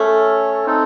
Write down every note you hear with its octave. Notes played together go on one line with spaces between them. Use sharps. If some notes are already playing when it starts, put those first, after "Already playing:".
Already playing: A3 C#4 A4 C#5
C4 D#4 A4